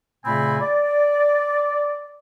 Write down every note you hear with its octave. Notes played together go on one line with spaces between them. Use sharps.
A#2 C#3 A3 C4 G#5 B5
D5